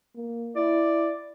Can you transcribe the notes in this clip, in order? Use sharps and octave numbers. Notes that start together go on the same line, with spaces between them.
A#3
E4 D5